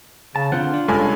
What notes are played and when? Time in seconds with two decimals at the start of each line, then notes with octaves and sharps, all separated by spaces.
0.36 C#3 A5
0.52 D3 D#3 C4 F4 C5 F#5
0.74 D4
0.88 F1 G2 G#3 C#4 A4 G#5